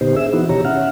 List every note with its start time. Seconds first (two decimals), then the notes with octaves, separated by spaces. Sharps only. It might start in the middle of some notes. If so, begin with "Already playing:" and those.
0.01 A#2 D3 B3 D#4 G4 C5
0.16 D4 G#4 E5 E6
0.33 E3 B3 D#4 E4 F#4
0.49 B2 D#3 G4 C#5 A#5
0.65 C#4 E5 F#5 F6